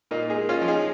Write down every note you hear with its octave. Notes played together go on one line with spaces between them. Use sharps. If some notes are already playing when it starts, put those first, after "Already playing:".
A#2 A#3 D#4
D#4 G#4
G#3
C#4 F4
F3
D#4 G#4